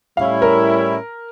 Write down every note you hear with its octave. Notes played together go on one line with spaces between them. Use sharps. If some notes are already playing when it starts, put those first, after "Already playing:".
A2 G3 C#4 E4 F5
A#4